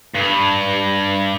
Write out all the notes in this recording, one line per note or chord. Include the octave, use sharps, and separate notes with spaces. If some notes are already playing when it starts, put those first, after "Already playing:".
G2